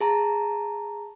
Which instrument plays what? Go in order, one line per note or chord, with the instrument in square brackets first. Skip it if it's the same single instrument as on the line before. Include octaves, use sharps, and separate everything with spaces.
[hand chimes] G#4 A5 A#5